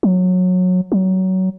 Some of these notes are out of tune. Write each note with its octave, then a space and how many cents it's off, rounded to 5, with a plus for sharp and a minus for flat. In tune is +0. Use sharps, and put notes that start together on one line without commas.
F#3 -20
F#3 +20